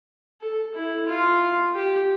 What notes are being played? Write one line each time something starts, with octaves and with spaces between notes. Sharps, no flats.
A4
E4
F4
G4